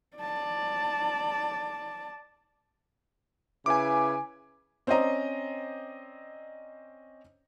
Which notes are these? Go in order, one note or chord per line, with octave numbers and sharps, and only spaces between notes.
D5 A5
C#3 E4 B4 G#5 D6
C4 C#4 C5 D5 D#5 A#5